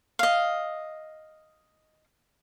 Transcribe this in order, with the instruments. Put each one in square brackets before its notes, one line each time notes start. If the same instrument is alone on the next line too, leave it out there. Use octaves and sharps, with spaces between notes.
[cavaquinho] D#5 F5